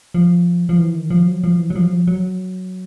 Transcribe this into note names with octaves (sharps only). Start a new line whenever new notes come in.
F3
F3
E3
D#3
F3
F#3
F3
E3
F#3
F3
F#3
F3
F#3